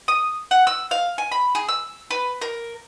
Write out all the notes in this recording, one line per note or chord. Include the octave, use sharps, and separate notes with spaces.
D#6
F#5
E6
F5
G#5
B5
G#4
E6
B4
A#4